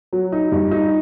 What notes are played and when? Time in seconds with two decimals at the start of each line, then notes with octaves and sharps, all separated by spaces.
0.13 F#3
0.32 D#4
0.52 G2
0.71 D#4